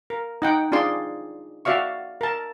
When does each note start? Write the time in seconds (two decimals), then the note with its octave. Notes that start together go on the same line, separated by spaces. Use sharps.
0.10 A#4
0.42 D#4 F#5 G5
0.72 D4 F4 G#4 D5 C6
1.65 F#4 D5 E5 F5 C#6
2.21 A#4 A5